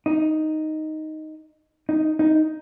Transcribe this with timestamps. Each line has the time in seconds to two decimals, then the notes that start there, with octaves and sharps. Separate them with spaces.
0.06 D#4
1.89 D#4
2.19 D#4